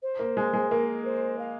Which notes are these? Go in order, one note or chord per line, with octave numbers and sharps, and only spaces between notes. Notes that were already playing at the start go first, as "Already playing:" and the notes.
C5
A#3
G#3
G#3
A#3 A#4
C5
F5